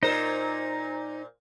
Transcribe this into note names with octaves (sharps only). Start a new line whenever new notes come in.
A#2 D#4 A#4 C5